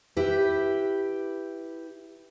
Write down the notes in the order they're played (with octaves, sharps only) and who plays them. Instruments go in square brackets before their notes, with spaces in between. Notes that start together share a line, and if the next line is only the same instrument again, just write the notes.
[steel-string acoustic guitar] E4 G4 B4